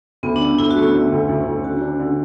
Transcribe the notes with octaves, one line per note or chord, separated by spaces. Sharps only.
D2 B3
D4
D3
D2 E4
F#4
A3
E4
D3
D2
D2
D2
D3 F#4
D4
D3